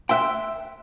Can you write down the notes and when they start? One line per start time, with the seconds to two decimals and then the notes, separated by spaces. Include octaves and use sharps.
0.09 E5 G5 C6 E6 F#6